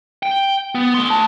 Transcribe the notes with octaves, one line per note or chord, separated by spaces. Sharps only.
G5
B3
A3 C6
A5